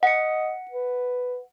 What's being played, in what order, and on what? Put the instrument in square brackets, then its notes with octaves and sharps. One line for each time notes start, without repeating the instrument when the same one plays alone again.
[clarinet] D#5 [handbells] F#5 C#7
[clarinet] B4